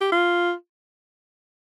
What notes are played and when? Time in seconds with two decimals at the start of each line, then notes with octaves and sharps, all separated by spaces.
0.01 G4
0.12 F4